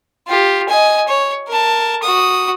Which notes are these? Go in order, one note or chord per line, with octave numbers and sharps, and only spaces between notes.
F4 G4
D#5 G#5
C#5
A#4 A5
F#4 D#6